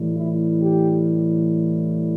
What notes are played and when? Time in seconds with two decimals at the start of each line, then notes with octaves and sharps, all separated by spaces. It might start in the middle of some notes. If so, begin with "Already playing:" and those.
Already playing: A2 E3 G3
0.15 E4
0.61 G4